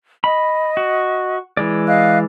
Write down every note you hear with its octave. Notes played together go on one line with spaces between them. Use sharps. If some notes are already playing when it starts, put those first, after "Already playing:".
D#5 B5
F#4
E3 G#3 D5
D#5 F5 F#6